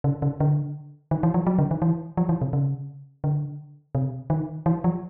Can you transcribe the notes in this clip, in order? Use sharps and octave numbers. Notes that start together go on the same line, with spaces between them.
C#3
C#3
D3
D#3
E3
F3
F#3
D3
D#3
E3
F3
E3
C3
C#3
D3
C3
D#3
E3
F3